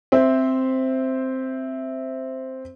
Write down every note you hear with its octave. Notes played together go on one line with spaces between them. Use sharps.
C4 C5 E5